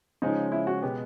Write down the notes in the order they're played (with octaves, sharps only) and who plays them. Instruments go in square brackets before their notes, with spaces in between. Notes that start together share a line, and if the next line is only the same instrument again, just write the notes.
[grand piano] C#3 F3 G#3 C#4 [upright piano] D#4
[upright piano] E4
F#4
[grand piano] B2 G#3 B3 [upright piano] G4